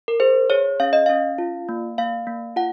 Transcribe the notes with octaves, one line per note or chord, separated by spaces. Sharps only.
A#4
G#4 C5
G#4 C#5
C#4 F5
D#5
C#4 F5
F4
A#3
A#3 F5
A#3
F4 F#5